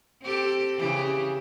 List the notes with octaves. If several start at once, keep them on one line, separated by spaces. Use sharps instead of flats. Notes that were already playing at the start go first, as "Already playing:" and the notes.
C4 G4 A4
C#3 E3 G4